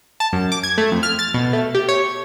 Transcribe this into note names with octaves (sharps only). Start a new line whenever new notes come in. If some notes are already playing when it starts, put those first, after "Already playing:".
A5
F#2
D6
G#6
A3
F2
F6
A6
B2
A3
G4
C#5